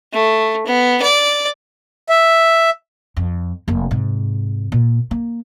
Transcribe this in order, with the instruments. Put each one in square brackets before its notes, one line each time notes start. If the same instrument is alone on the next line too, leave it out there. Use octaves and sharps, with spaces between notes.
[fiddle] A3
B3
D5
[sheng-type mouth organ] E5
[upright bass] F2
F1 A#3
G#2 C3
A#2
A#3